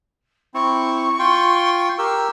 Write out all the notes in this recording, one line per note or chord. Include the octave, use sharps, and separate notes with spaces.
C4 E4 C#6
F4 G5 C6
G4 A#4 E6